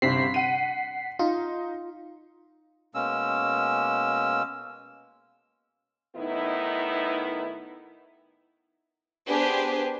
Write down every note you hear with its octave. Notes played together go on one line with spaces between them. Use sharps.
G1 C3 C4 B6 C7
F#5 D#7
D#4 F4
B2 G#3 A#3 C#4 E6
A2 D#3 B3 D#4 E4
B3 D4 G4 G#4 B4 C5